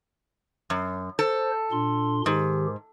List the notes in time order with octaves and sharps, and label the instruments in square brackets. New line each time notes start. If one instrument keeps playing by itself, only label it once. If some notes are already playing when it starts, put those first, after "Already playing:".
[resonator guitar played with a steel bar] F#2
[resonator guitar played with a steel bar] A4 [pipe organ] C5
[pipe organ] A#2 D4 C6
[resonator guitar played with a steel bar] G#2 [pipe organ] D#3 G4